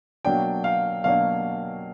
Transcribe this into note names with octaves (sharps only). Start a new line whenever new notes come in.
B2 F#3 A#3 D4 G5
F5
B2 F#3 A#3 D4 F5